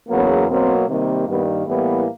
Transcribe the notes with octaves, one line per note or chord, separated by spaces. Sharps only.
E2 C#3 F#3 A#3 B3
B2 F#3 A#3 C4
C3 D#3 G3 A#3
G2 D#3 G3 A#3 B3
A2 E3 G3 A#3 B3